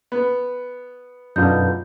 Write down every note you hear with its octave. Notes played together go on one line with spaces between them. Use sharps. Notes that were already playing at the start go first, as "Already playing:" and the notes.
B3
F#2 B2 D3 D#4 F4 G6